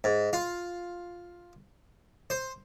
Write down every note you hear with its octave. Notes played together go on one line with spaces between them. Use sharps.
G#2
F4
C5